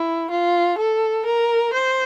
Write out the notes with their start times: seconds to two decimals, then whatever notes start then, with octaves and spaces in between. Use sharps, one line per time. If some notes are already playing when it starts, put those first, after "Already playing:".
Already playing: E4
0.30 F4
0.78 A4
1.25 A#4
1.73 C5